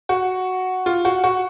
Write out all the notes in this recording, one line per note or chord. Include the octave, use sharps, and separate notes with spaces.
F#4
F4
F#4
F#4